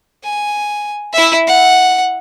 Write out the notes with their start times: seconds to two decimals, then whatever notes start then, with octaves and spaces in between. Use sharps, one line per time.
0.24 G#5
1.13 E4 E5
1.47 F#5